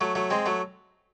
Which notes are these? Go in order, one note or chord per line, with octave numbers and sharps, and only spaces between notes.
F#3 A3
F#3 A3
G#3 C4
F#3 A3